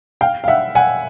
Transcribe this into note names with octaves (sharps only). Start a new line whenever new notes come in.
F5 G5
F5
E5 F#5
F#5 G#5